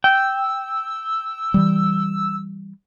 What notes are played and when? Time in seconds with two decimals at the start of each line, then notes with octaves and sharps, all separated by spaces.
0.04 G5 E6
1.54 E3 G3